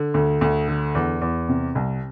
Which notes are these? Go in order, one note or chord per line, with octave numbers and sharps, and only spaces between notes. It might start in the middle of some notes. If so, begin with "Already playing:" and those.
Already playing: D3
D2
D2
D3
E2
E2
C3
C2